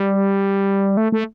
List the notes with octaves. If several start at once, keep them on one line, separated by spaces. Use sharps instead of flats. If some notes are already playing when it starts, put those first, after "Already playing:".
Already playing: G3
A3
A3